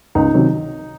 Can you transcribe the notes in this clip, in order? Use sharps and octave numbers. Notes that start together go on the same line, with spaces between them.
C#2 D#4
C3 D#3 F#3